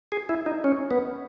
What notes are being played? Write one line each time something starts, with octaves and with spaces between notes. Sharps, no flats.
G#4
E4
D#4
C#4
B3